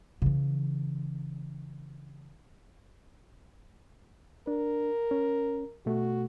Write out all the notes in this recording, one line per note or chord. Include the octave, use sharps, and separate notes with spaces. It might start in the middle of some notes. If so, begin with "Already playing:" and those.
C#3 E3
D4 A#4
C#4
B2 A3 F#4